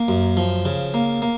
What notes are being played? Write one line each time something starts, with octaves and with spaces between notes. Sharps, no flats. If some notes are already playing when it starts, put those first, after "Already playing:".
Already playing: A#3
F#2
F3
C#3
A#3
A#3